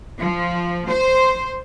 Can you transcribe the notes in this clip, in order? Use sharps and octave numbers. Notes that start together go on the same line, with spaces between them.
F3
C5